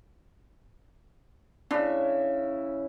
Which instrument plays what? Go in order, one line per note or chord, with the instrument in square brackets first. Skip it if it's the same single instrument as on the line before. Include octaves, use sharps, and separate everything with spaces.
[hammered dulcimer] C#3 E4 [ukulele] D4